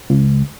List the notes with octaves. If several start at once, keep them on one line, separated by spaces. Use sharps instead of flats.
C#2